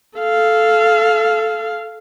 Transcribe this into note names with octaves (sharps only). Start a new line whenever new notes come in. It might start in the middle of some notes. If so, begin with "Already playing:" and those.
A4 F5